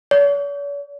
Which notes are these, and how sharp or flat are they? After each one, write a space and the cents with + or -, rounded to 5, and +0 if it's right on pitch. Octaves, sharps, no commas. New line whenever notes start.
C#5 +45